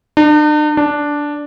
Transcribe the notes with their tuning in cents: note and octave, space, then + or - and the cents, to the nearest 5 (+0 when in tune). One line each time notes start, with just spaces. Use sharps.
D4 +45
D4 -5